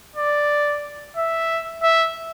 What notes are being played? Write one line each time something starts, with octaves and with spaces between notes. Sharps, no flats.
D5
E5
E5